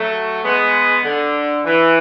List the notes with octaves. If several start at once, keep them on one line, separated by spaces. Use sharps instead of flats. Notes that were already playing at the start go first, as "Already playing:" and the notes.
Already playing: F#3 A3
G#3 B3
D3
E3